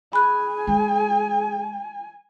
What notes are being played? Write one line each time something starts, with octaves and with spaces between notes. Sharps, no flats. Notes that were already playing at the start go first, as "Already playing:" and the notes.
G#4 G#5 B5 F#6
G#3